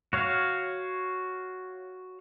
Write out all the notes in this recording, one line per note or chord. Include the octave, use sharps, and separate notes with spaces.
F#4 C#5 F5